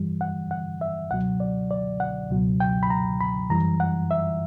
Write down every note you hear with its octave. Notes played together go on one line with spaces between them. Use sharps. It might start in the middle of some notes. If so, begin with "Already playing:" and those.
Already playing: G2 E3 G3
F#5
F#5
E5
C#2 B2 F#3 F#5
D5
D5
F#5
C#2 B2 F#3
G5
B5
A#5
B5
F#2 E3 G3 A#5
F#5
E5